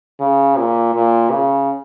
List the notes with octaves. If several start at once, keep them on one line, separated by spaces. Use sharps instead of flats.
C#3
A#2
A#2
C#3